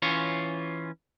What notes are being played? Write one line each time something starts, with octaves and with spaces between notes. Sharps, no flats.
E3 C#4 F4 C#5